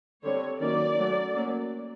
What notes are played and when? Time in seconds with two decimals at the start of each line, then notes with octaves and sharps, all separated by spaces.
0.24 D3 G3 C4 C#5
0.61 D#3 F#3 A#3 C#4 D5
0.98 F#3 A3 C#4
1.35 F#3 A#3 C#4